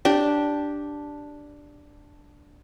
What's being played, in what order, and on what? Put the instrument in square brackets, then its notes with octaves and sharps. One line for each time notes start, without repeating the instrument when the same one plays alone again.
[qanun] D4 G4